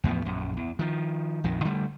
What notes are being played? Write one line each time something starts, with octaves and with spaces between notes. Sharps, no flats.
E2 A2 F3 B3
A#1 F#2
E2
D#3 F3
A#1 F2 D#3
D3 G3 A3